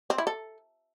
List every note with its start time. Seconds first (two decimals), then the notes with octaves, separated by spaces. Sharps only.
0.10 C4
0.18 E4
0.27 A4